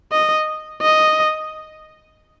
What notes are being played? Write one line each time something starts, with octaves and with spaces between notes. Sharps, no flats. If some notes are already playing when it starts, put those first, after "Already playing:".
D#5
D#5